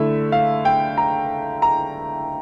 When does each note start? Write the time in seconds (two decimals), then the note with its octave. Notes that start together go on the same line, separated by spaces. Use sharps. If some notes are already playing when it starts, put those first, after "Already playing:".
Already playing: D3 A3 E4 E5
0.32 F5
0.65 G5
0.98 A#5
1.62 A#5